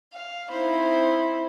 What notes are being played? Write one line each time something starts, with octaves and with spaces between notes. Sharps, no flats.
F5
C4 D#4 E4 C5 B5